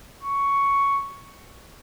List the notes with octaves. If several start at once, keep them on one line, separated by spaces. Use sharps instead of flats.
C#6